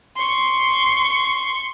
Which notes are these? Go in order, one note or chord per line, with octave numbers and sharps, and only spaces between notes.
C6 C#6